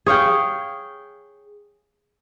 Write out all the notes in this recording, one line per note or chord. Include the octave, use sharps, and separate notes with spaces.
G#4 C#5 F5 G5